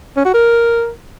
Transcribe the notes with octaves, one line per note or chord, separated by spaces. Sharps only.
C#4
F#4
A#4